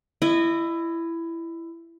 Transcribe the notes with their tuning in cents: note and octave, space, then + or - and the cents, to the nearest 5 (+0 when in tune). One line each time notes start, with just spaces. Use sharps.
E4 +15 D#5 -20